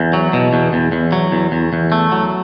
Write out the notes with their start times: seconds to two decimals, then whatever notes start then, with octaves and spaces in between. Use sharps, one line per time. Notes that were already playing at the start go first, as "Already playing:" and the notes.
Already playing: E2
0.13 F#3
0.33 B2
0.53 E2
0.73 E2
0.92 E2
1.12 F#3
1.32 E2
1.52 E2
1.73 E2
1.92 A3
2.12 F#3